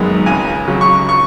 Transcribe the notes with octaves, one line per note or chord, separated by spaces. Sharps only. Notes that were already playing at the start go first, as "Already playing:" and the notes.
Already playing: G#1 F#2 D#3 G#3 B3
C#2 G#5
C#3 F#3
C#6
C#6